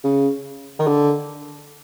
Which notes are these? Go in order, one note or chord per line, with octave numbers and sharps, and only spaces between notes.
C#3
D#3
D3